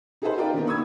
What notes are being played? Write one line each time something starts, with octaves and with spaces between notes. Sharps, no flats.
D#4 G#4 A4 B4 C5
F4 A#4 D5 G5
D3 D#3 A#3 B3
B5 C#6 D#6 E6 G#6